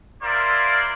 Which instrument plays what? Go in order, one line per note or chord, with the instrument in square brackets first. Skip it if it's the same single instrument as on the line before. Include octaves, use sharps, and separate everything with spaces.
[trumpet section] E4 F4 A#4 C5 D5